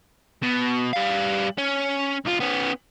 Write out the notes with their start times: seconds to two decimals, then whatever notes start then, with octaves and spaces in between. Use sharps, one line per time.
0.43 B2
0.93 G3 F5
1.58 C#4
2.25 B1 F4
2.40 B3 C#4